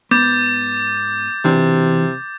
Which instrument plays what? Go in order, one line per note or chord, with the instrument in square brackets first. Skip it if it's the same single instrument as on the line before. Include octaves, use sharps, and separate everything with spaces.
[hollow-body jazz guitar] G#2 B3 [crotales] D6 G6 A6
[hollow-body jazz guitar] B1 E3 D4 [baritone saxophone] C3